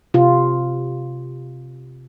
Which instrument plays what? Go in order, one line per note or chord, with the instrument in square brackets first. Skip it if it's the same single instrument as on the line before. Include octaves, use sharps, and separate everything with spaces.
[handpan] C3 F4